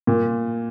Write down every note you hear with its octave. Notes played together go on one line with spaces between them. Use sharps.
A#2